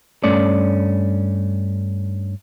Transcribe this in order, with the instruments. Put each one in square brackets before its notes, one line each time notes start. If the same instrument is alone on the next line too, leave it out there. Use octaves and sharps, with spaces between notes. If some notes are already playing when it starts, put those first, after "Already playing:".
[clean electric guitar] G2 A3 C#4 D5